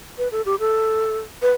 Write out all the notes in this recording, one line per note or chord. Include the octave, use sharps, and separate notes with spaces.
B4
A4
G4
A4
B4